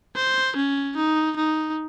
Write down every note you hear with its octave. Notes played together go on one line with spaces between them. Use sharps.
C5
C#4
D#4
D#4